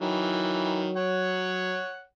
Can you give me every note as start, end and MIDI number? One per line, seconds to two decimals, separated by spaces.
0.01 0.90 51
0.01 0.90 52
0.01 1.80 54
0.97 2.04 73
0.97 2.04 78